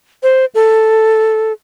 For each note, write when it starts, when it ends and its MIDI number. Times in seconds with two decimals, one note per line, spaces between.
0.23 0.45 72
0.55 1.52 69